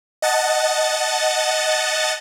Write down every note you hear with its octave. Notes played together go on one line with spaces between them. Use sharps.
D#5 F#5 A5 A6